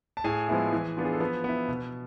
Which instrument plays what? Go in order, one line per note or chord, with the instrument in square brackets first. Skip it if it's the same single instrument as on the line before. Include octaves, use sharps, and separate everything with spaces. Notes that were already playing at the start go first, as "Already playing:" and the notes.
[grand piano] A5
A2 G#4 G#5
F3 G#3 B3 E4
E3
B3 D4 F4
G#4
A4
F3 B3 B4
B3 E4
B2